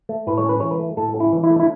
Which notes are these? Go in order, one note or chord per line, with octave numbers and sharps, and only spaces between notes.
A3
A2 B4
C#5
C#4
B4
E3 C#5
B4
A3
A2 A4
C#4
E4
E3
E4
A3
E4